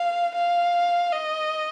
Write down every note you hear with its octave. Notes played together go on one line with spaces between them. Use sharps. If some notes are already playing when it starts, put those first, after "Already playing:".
Already playing: F5
F5
D#5